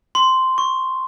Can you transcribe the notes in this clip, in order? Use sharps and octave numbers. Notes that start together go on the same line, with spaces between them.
C6
C#6